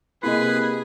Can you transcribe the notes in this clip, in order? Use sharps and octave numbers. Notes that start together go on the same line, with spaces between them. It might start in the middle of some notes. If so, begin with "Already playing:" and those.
C3 A#3 E4 G#4 B4 D#5